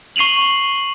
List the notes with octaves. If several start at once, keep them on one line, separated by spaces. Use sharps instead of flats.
C#6 C7 D#7 F7 F#7